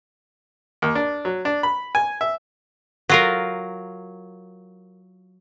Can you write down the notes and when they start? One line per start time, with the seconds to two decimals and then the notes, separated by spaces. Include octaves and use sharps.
0.82 D#2
0.95 D4
1.25 F#3
1.45 D4
1.63 B5
1.95 G#5
2.21 E5
3.09 F#3 F4 A#4